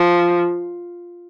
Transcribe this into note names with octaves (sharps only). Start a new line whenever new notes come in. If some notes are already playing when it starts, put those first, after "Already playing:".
Already playing: F3